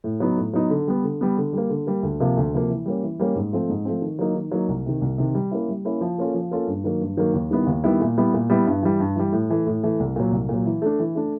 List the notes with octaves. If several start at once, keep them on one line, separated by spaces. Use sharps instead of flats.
A2
F#3 B3 D#4
A2
F#3 B3 D#4
D3
G3 B3
D3
G3 B3
D3
G3 A#3
D3
G3 A#3
D2
C3 F3 A#3
D2
C3 F3 A#3
E3
G3 A#3 C#4
E3
G3 A#3 C#4
G#2
F3 A3 C4
G#2
F3 A3 C4
D#3
F#3 A#3 D#4
D#3
F#3 A#3 D#4
C2
C3 D#3
C2
C3 D#3
G3
A#3 C#4 E4
G3
A#3 C#4 E4
F3
A#3 C#4 F4 A4
F3
A#3 C#4 F4 A4
G2
D#3 F#3 A#3
G2
D#3 F#3 A#3
D#2
D#3 G3 B3 E4
D#2
D#3 G3 B3 E4
A#2
G3 B3 E4
A#2
G3 B3 E4
G2
E3 G3
G2
E3 G3
A2
E3 A3
A2
E3 A3
C2
A#2 F#3
C2
A#2 F#3
E3
A3 D4
E3
A3 D4